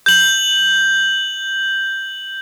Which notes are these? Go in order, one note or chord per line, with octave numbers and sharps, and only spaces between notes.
G6 F#7